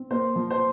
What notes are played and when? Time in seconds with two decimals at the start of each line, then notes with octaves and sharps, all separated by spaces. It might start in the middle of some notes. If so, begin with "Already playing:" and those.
Already playing: C4
0.11 A#3 C5
0.36 F3
0.51 C5